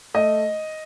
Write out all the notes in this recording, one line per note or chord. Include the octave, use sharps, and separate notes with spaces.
A3 D#5